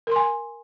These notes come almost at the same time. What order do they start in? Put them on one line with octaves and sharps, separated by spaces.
A#4 C6 G#5